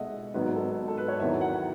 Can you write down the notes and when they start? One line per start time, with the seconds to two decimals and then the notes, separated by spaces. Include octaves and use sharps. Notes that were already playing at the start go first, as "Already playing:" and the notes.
Already playing: B2 G#3 A4 D#5 E5 F#5
0.34 G#1 G#2 F#3 B3 B4
0.55 A4
0.88 A4
0.98 B4
1.08 C#5
1.20 E2 D#3 F#3 E5
1.41 F#5